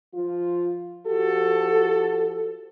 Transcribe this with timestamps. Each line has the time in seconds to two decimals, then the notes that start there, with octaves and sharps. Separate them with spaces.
0.15 F3 F4
1.07 F3 F#4 G4 A4